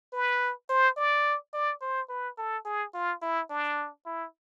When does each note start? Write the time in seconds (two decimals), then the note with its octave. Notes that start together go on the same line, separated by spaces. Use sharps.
0.13 B4
0.69 C5
0.97 D5
1.53 D5
1.81 C5
2.09 B4
2.38 A4
2.65 G#4
2.94 F4
3.22 E4
3.50 D4
4.06 E4